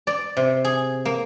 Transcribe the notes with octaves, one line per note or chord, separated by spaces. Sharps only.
D5
C3
G#4
A#3